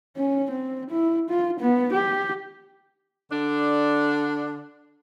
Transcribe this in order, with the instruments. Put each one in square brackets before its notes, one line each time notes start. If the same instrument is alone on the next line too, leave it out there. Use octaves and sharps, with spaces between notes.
[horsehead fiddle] C#4
C4
E4
F4
B3
G4
[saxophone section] D3 D4